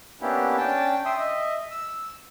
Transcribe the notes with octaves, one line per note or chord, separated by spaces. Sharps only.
A#3 B3 C#4 D4 E4 G4
C#4 D4 G5 A5
E5 G5 C6 D#6 E6
D#5 E5
E6